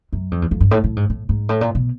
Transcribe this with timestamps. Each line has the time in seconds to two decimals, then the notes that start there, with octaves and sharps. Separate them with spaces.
0.13 F#2
0.31 F2
0.42 E2
0.51 F2
0.60 G2
0.71 A2
0.84 A2
0.96 G#2
1.10 A2
1.29 G#2
1.49 A2
1.61 A#2
1.75 B2